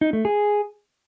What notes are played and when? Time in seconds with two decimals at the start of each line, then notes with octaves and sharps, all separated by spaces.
0.01 D#4
0.13 A3
0.25 G#4